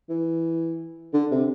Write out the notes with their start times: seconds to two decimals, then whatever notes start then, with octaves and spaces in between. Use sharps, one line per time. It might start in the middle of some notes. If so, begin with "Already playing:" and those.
0.09 E3
1.13 D3
1.31 C3